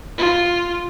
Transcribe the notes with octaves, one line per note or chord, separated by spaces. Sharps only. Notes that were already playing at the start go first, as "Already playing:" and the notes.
F4